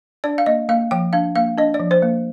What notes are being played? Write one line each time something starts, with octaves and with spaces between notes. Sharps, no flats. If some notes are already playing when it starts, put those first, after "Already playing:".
D4 D5
F5
A#3 D#5
A#3 F5
F3 G5
D4 F5
A#3 F5
D4 D#5
D5
F3
C5
A#3